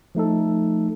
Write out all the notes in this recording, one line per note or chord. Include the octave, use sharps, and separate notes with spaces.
F3 A3 D#4 A4